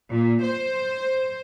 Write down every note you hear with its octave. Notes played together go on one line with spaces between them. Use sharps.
A#2
C5